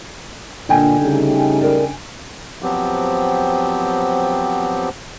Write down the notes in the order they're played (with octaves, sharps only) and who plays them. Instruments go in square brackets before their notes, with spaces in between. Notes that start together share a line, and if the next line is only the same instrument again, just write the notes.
[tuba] A#2 [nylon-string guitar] D3 D#5 [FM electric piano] D4 G5 G#5
[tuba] C#3 [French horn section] G3 A3 D#4
[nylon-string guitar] E4 A#4 D5
[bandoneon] F3 F#3 B3 C4 G4